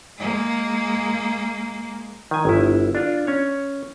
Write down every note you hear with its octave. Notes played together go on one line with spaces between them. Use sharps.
G#3 A#3
D#3 G#5
G1 E4
D4 F4
C#4 C#5